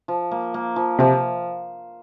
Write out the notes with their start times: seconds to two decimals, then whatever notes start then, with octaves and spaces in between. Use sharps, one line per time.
0.08 F3
0.31 A#3
0.54 A#3
0.76 F3
0.99 C3 F3